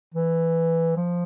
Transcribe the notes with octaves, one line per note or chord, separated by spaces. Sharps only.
E3
F3